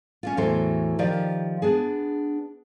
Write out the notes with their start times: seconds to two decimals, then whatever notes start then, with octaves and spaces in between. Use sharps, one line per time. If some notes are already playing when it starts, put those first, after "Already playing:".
0.23 C#4 D4 F4
0.37 E2 A2 E3 F#3 A4 C5
0.99 D#3 F3 G4 D5
1.62 B3 D4 G#4